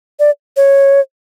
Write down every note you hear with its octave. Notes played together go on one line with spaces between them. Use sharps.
D5
C#5